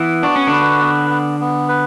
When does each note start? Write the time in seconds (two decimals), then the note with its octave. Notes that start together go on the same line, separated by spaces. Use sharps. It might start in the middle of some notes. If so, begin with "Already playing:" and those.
Already playing: E3 B3
0.23 D4 F#4
0.36 C#4
0.47 D3 D4 B4
0.81 B3
1.10 B3
1.40 B3
1.69 B4